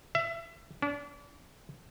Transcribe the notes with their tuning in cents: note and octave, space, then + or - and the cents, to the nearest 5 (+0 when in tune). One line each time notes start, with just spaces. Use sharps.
E5 +25
D4 -35